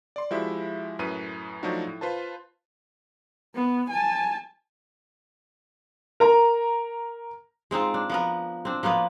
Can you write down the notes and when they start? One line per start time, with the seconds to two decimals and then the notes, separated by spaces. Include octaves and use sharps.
0.16 D5 C6
0.31 F3 G#3 E4 F#4 G4 E5
0.99 F#2 A2 B4 D#7
1.63 F3 F#3 A3 D4 D#4 F#4
1.87 A2
2.01 F4 B4 C5 A5
3.55 B3
3.90 G#5 A5
6.20 A#4 A#5
7.71 G#3 C4 D#4 F4
7.94 D4
8.10 F3 B3 A#4
8.65 C4 D4
8.83 F3 A#3 B3 F4